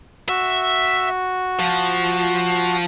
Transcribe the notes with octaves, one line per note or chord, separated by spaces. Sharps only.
F#4 E5
F3